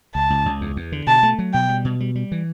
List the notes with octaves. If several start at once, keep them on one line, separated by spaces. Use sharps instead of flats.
C#2 A5
C#2
C#2
E2
E2
D3
B2 A5
A3
F#3
B2 G5
G3
B2
G3
G3
E3